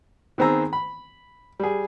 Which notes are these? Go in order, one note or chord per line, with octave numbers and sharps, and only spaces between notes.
D#3 B3 C4 G#4 A#5 E6
B5
G3 G#4